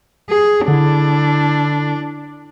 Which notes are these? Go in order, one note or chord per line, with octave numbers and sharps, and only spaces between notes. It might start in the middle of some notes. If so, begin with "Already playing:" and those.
G#4
D3 D4 E4